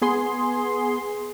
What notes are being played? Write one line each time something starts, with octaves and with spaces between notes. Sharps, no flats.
B3 G#4 C6